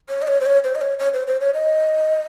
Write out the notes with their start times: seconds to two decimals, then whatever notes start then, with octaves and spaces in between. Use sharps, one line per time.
0.09 C#5
0.22 D#5
0.28 C#5
0.41 C5
0.46 C#5
0.64 C5
0.75 D#5
0.81 C#5
0.99 C#5
1.13 C5
1.27 C5
1.41 C#5
1.54 D#5